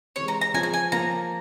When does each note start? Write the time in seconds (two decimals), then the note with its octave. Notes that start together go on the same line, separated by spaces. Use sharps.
0.16 C3 E3 G#3 C#5
0.28 A#5
0.41 A#5
0.54 F3 C4 F4 G#4 C#5 G#5
0.63 A#5
0.74 G#5
0.92 F3 A#3 F4 A#5